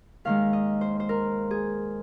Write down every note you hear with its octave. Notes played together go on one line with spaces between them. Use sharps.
D#2 D#3 G#3 F5
D#5
C5
C5
A#4
G#4